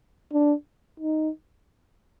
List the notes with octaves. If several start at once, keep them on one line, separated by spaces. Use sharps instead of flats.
D4
D#4